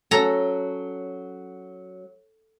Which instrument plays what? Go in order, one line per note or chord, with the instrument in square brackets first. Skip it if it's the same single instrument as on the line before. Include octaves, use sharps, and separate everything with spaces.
[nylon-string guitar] F#3 C#4 [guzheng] A4 A#5